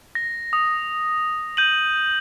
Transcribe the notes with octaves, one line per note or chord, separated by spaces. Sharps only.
A#6
D#6
G6 D#7 F#7